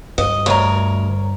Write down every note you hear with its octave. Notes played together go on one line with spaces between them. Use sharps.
G2 D#5
D2 A#4 C#5